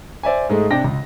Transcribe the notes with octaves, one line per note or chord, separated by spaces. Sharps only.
C5 D5 E5 G#5
G#2 G#3 A3
C3 D4 G5 A#6
C#2